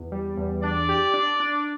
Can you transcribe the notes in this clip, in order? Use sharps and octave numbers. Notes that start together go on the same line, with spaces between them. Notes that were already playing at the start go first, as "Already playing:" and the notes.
Already playing: E2
G3
E2
D4 D5
G4
D4
D4